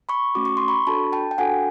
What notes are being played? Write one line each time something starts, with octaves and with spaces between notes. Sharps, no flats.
B5 C#6
A3 C#4 F#4 D6
C#6
C6
B5 C#6
D4 F#4 A4 A5 B5
G5 A5
G5
D4 F#4 A4 F#5 G#5